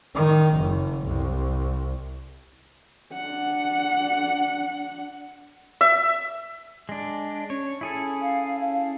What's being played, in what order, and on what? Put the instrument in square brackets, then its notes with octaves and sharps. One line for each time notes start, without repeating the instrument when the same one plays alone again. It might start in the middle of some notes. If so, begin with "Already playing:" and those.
[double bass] D#3
F#1
C2
[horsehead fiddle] D4 F#5
[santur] E5
[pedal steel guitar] G#3 D4
[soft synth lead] C#4 [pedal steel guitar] C#5
[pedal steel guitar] E4 G#4 A4
[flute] F5
F5